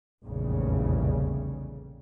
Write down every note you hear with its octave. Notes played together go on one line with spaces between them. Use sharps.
F1 A#1 E2 C#3 G3